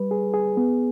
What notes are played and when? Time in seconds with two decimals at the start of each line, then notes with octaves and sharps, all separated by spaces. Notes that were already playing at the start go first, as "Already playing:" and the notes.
Already playing: G3 B4
0.11 G#4
0.34 G#4
0.57 B3